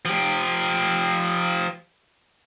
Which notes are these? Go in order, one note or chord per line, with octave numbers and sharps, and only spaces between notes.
F3 G4